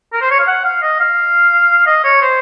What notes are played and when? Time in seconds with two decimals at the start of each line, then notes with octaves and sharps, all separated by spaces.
0.13 A#4
0.21 C5
0.31 C#5
0.39 F5
0.47 F#5
0.64 F5
0.82 D#5
1.00 F5
1.87 D#5
2.04 C#5
2.21 C5